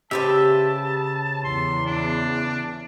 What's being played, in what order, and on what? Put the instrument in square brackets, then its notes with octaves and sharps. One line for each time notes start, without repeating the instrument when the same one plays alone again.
[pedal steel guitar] C#3 E5 [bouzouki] G4 B4 C5 [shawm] A5
[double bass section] E2 [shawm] C6
[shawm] D4